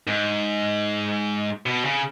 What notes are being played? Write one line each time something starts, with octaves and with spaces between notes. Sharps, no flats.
G#2
B2
C#3